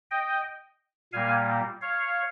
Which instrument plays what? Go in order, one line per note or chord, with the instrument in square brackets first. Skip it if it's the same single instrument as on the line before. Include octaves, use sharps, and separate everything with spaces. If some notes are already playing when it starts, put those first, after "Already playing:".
[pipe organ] D#5 G5
A#2 G3 A#3 F5 G#5
C#5 F5